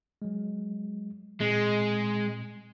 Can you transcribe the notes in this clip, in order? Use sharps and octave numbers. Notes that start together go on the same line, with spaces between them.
F#3 G#3
A#2 G#3 C4